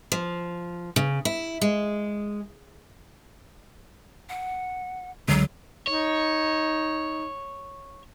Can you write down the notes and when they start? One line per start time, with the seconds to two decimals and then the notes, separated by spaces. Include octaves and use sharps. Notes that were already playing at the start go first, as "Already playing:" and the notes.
0.12 F3
0.96 C#3
1.25 E4
1.61 G#3
4.29 F#5
5.28 C#2 D3 F#3 G#3
5.87 D#4 C#5